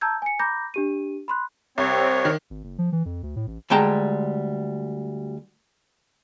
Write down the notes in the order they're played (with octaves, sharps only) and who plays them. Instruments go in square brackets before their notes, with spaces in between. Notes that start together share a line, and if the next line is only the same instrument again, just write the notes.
[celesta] A5 A#5 E6 G6 G#6
G#5 C#7
A#5 B5 D6 G6 A#6
D4 G4 D#7
B5 C6 F#6
[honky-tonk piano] C2 [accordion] C4 C#5
[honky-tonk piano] D#3
[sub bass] G#1
F#1
F3
E3
F2
D2
A2
A1
[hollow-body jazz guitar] D2 G3 G#3 G5 A5 A#5